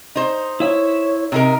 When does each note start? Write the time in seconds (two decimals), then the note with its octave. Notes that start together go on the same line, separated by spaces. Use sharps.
0.15 D#4 C5
0.60 E4 C#5 E5
1.32 C3 D#4 A#4 A#5